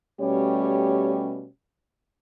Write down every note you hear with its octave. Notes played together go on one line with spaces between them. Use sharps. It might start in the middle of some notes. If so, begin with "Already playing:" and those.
B2 G3 A3 C#4 G4 C#5